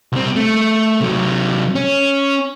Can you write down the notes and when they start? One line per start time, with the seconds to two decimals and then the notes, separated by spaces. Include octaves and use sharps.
0.13 C2 C4
0.36 A3
1.00 C3 F#3
1.75 C#4